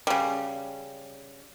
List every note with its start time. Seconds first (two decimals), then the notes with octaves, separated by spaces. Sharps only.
0.07 C#3 G3